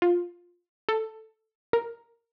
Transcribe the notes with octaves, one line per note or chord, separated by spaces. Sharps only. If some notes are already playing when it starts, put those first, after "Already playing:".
F4
A4
A#4